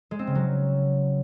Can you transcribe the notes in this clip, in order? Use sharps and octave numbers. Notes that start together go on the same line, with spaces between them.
G#3
C4
C#3
F#3